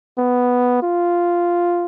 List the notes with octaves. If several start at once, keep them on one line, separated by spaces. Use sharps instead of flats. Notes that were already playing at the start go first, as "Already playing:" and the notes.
B3
F4